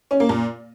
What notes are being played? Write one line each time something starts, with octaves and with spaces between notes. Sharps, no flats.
C#4
A#3
A#2